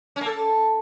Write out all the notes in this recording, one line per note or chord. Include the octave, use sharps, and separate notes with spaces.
C#4
A#3
A4